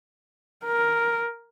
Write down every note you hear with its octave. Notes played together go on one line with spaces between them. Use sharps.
A#4